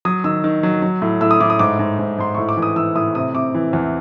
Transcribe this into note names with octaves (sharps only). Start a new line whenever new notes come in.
F#3 D#6
D#3 E6
D#3
F#3
F#3
A2
A2 E6
D#6
A2 D6
D#6
G#2 D6
G#2
G#2
G#2 C6
A2 C#6
D6
E3
D#6
E3 E6
A2 D#6
C3 D#6
C3 D6
E3
E2